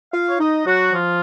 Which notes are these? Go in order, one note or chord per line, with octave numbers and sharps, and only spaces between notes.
F4 F5
C#5
D#4 D#5
F#3 F#4
F3 F4